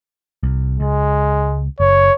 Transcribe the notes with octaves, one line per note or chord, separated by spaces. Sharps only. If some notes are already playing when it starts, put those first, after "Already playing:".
C2
C#2 G#3
F#1 C#5